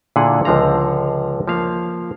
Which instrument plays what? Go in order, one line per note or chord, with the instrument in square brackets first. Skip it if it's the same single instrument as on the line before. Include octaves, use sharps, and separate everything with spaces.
[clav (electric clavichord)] A#2 D3 E4 G#4 F#5
C#2 D3 F3 F5 A#5
F3 A#3 F5